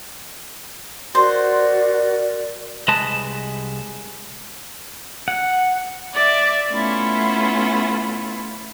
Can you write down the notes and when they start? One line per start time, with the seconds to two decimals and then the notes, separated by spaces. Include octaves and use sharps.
1.15 F#4 A#4 C5 D5
2.88 C2 G#3 B4 D#5 A5
5.28 F#5
6.14 D5 E5 D6
6.71 A3 B3 C#4 E4 F4